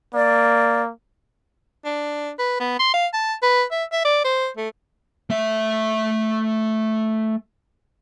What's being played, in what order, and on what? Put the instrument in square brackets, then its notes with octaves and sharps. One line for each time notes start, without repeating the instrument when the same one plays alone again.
[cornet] A#3 [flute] D5
[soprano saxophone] D4
B4
B3
C6
F5
A5
B4
E5
E5
D5
C5
A3
[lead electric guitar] A3 E5